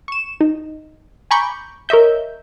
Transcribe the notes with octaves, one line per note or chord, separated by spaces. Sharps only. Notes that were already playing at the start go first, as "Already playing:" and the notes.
C#6 E7
D#4
G#5 A#5 B5 C#6 D6 G6
A#4 C#5 D#5 E5 G6